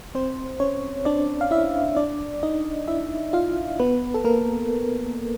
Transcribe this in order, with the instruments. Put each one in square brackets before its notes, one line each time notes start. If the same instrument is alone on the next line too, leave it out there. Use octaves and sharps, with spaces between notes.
[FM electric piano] C4 C5
C#4 C#5
D4 D5
F5
E4 E5
D4 D5
D#4 D#5
E4 E5
F4 F5
B3 B4
A4
A#3 A#4